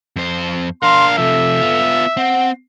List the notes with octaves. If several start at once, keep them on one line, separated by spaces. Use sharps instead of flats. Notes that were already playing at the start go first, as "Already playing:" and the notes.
F2 C5
D4 A#4 F5 C6
C3 F3 A4 E5
B3 F4
C4 F#5